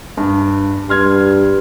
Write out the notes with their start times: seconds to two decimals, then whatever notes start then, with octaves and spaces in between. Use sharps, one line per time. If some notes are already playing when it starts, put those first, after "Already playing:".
0.17 G2
0.89 G2 C6 F6 G#6